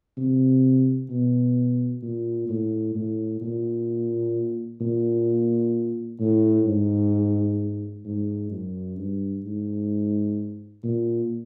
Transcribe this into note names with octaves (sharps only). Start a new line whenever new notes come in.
C3
B2
A#2
A2
A2
A#2
A#2
A2
G#2
G#2
F#2
G2
G#2
A#2